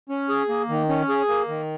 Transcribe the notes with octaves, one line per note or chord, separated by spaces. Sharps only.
C#4
G#4
A#3
D#3
C#4
G#4
A#3
D#3